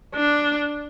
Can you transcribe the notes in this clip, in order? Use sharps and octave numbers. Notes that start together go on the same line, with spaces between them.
D4